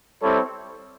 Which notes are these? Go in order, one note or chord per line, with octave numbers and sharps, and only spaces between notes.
G3 C4 E4 A4 C#5